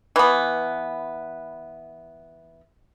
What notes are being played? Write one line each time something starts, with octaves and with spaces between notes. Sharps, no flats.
E3 B3